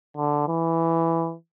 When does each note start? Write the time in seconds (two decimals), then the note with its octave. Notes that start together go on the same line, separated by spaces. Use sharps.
0.17 D3
0.48 E3